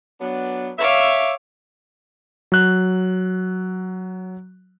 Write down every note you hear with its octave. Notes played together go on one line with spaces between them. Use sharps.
F#3 B3 D4
C#5 E5 F5 D6
F#3 F#6